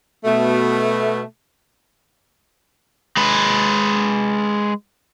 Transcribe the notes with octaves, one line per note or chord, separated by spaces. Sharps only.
B2 A3
G#3 B4